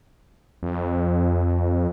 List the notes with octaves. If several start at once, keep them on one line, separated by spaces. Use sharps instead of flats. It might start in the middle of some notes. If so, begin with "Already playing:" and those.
F2